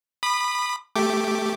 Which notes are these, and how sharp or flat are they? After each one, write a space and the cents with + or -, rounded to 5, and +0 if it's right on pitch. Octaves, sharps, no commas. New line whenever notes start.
B5 +0 D#6 -40
A3 +0 G4 +0 D6 +0